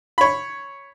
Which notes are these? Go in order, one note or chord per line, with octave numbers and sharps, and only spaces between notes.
C#5 B5